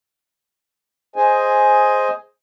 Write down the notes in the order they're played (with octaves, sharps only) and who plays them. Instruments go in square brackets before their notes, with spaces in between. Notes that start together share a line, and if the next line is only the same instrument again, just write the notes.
[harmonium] G#4 C5 D#5 G#5